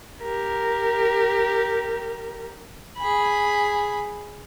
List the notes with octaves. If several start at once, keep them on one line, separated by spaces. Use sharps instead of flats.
G4 A#4
G#4 B5